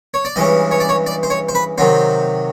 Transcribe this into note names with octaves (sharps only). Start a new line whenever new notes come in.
C#5
D5
G2 E3 G#3 C#4 D#5
C#5
D5
C#5
D5
C5
C#5
C5
B4
C3 D#3 F#3 C5